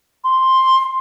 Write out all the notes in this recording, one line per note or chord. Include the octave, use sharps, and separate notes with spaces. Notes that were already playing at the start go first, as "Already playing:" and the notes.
C6